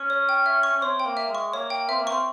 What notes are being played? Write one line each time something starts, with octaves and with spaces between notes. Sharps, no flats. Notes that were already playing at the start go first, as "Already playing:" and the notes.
Already playing: C#4 C#6
C#5
G5
E5
C#6
C#4
C4 C#5
G5
A#3
E5
G#3
C#6
A#3 C#5
G5
C4 E5
A#3
C4 C#6